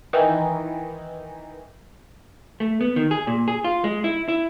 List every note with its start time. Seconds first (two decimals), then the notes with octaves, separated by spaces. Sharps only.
0.13 D#3 E3 D#4
2.60 A3
2.81 B3
2.96 D#3
3.11 G#4
3.27 A#2
3.48 G#4
3.64 F4
3.84 G#3
4.04 E4
4.28 E4